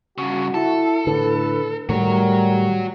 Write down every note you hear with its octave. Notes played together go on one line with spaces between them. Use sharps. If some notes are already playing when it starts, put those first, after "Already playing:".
G2 C#3 F#4
E4 A4
A2 D3 B4
A2 D#3 G3 A3 F#4 A#4 C#5